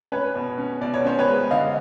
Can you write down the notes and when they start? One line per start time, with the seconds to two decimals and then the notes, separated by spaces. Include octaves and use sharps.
0.12 C#4 B4 C#5
0.35 B2
0.58 C#4
0.81 B2 D5
0.94 C#5
1.05 C#4 C5
1.19 B4 C#5
1.27 G#3
1.51 D3 D#5 F5